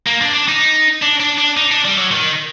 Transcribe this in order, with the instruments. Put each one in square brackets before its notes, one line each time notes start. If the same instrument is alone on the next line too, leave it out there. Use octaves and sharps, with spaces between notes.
[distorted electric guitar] A#3
D4
D4
D#4
D4
D4
D4
D#4
D4
G3
F#3
D#3